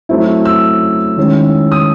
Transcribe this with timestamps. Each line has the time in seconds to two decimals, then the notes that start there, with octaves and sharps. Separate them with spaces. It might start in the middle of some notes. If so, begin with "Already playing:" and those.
0.09 F#3 A3 C4 E4
0.45 E6
1.17 D#3 G#3 C#4 E4
1.72 D#6